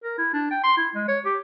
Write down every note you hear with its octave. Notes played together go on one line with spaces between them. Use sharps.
A#4
E4
D4
G5
C6
E4
G#3
C#5
G4